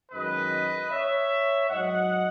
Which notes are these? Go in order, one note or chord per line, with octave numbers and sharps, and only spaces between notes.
F#2 D#3 G#3 B4 D#5
C#5 E5
G#2 F#3 D#5 F#5